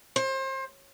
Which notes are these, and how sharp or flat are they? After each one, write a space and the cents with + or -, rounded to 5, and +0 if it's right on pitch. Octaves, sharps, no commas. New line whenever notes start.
C5 +30